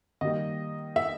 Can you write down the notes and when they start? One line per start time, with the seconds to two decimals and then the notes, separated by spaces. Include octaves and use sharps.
0.21 D#3 G3 A#3 D#5
0.96 E5